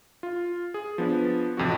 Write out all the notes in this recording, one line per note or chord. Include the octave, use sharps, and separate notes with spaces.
F4
G#4
F3 B3 D4
A1 F2 C3 F#4